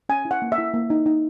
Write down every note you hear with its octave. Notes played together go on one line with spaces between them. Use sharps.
C#4 G#5
E4
F#5
A#3
E5
E4
A#3
D#4
D#4